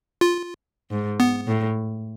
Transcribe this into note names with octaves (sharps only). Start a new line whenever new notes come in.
F4
G#2
B3
A2